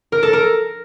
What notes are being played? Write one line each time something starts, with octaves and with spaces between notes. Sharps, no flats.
A#4
A4
A#4